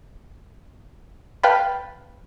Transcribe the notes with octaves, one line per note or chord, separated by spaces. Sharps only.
B4 F5 G5 A5 B5